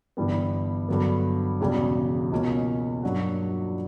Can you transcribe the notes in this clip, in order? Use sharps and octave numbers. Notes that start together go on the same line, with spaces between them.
G1 G2 E3 G3 B3
G2 D3 F#3 B3
E1 E2 C#3 G3
C#2 B2 A#3 C#4
G2 F#3 A#3 D4 F#4